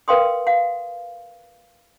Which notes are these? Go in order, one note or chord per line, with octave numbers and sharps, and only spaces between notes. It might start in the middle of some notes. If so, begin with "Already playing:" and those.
A#4 B4 F5 G5 C6 D#6
F5 F#5